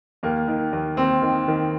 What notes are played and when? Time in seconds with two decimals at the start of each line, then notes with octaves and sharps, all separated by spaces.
0.23 D#2 A#3
0.48 D#3
0.73 D#2
0.97 D#2 C4
1.22 D#3
1.48 D#3